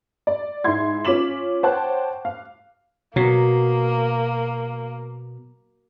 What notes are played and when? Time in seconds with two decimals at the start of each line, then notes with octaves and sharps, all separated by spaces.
0.27 D5
0.64 G#2 E4 C6 G#6
1.05 C#4 F4 D6 B6 E7 F#7
1.63 C5 C#5 F#5 G5 A5 F#6
2.25 F5
3.16 B2 F#3 A#3